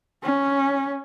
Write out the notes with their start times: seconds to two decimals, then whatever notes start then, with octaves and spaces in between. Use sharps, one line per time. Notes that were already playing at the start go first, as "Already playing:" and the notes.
0.23 C#4